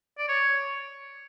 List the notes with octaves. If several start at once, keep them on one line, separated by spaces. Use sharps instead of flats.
D5
C#5